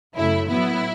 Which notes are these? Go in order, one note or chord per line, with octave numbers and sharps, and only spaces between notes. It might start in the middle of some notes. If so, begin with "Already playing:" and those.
F#2 C#3 A3 E4
A2 F#3 B3 E4